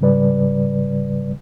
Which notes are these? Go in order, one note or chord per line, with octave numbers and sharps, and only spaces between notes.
G#2 C#3 G3 B4 D5